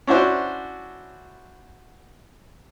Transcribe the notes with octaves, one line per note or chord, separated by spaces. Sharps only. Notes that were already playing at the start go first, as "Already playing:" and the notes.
C#4 D4 E4 F#4 C5